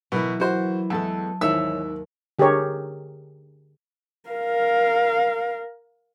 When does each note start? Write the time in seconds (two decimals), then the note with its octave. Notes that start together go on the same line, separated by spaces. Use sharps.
0.12 B2 E3 F#3 E4 A#4 B4
0.40 F#4 C5
0.90 E2 G#3 B3 A4 E5 A5 E6
1.41 D#2 G#2 E3 C#5 E5 E6
2.39 D3 G4 G#4 A#4 C#5
4.29 A#4 F5